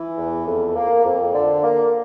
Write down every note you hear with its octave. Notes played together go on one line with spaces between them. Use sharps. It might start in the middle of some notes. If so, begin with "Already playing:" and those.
Already playing: E3
E2
F2
A#3
F2
D3
A#3